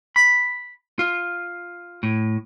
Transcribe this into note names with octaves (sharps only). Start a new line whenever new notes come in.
B5
F4
A2